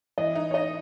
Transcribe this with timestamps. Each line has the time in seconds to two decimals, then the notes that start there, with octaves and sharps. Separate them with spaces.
0.18 E3 D#5
0.35 D#4
0.51 C#5
0.54 D#4 D#5